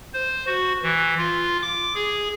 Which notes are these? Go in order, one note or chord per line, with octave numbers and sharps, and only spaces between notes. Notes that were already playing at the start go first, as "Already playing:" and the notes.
C5
F#4
E3
F4
D6
G#4